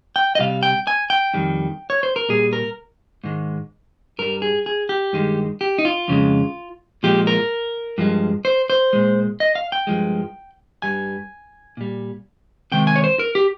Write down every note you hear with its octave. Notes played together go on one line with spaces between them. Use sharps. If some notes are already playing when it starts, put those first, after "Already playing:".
G5
D#5
C3 G3 F5
G5
G#5
G5
F2 D#3 G3
C#5
C5
A#4
A#2 G3 G#4
A#4
G#2 D#3 G#3
G2 G3 A#4
G#4
G#4
G4
G2 D#3 G#3
G4
D#4
F4
F2 C#3 G#3
A#2 F3 G#3 G4
A#4
G2 F3 G#3
C5
C5
A#2 G#3
D#5
F5
G5
G2 F3 G#3
G2 G3 G#5
A#2 G3
C3 D#3 G#3 G5
G#5
C#5
C5
A#4
G4